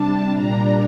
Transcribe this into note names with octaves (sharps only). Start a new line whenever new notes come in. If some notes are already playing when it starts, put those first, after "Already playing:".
Already playing: C3 G3 D4 A5
A#2 G3 D4 A#5